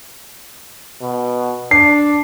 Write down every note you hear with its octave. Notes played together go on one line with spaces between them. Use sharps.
B2
D4 C7